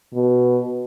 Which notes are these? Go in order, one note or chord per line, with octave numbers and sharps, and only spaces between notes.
B2